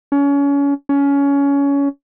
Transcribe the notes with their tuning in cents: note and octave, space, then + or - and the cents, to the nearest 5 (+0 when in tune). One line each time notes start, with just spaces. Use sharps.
C#4 +30
C#4 +20